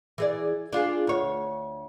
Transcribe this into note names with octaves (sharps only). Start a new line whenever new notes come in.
E3 G#4 D5
D4 F4 G#4
D2 C#5